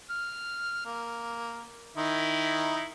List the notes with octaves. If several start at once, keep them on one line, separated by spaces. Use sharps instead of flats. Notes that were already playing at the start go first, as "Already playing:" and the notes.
F6
A#3
D#3 D#4 E4